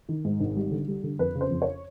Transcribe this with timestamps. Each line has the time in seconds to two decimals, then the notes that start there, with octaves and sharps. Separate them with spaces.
0.09 D#3
0.25 G#2
0.40 G#1
0.56 G3
0.72 D3
0.88 G3
1.03 D3
1.19 F2 B4
1.35 C#3
1.41 C5
1.51 F2
1.62 C#5